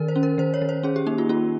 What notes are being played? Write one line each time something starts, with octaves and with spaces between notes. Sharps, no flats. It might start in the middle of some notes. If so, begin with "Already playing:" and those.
Already playing: D#3 A#4
C5
C#4
A#4
D#3 C5
C#5
D#3
C5
C#4 G#4
G4
A#3 D#4
F4
C#4 F4